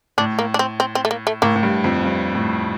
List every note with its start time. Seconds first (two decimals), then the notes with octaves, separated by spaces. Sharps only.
0.18 A2 D4
0.39 A#3
0.54 D4
0.59 C4
0.80 C4
0.95 C4
1.05 A3
1.11 A#3
1.27 A3
1.42 A2 A#3
1.56 A2
1.63 G2
1.84 F2
2.04 G2
2.35 A2